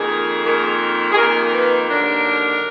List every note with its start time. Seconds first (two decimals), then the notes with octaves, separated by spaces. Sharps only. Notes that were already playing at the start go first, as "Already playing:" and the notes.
Already playing: F2 D#3 A#3 G#4
0.44 F2 D#3 A#3
1.12 G#4
1.16 F2 D#3 A#3 A#4
1.53 B4
1.89 D#2 D3 F#3 D4 A#4